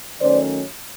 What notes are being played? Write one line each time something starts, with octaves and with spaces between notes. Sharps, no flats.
D#3 F#3 A3 C#4 C5 D5